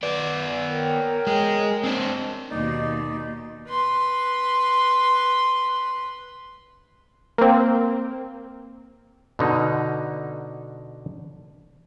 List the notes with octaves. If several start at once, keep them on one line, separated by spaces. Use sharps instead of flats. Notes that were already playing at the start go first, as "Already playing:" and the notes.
B3 D5
A#4 C#5 G5
G#3 G#4
C4 D4
D#2 B2 D#4 D5
B4 C6
A#3 C4
B2 D3 D#4